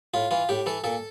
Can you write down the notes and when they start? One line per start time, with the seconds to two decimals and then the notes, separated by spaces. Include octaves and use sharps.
0.14 A2 F4
0.31 E3 F4
0.49 A2 G4
0.66 E3 A4
0.84 A#2 A4